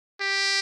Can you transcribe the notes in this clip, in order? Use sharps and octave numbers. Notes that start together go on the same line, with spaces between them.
G4